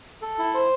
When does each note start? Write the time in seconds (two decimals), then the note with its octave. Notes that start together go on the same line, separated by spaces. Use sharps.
0.22 A4
0.38 E4
0.54 C5